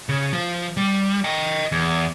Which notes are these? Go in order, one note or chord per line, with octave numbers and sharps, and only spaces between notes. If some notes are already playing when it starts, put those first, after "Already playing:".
C#3
F3
G3
D#5 G5
E2